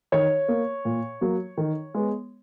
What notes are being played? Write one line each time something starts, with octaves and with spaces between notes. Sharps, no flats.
D#3 C#5
A#3
A#2
F#3 A#3
D#3
G#3 B3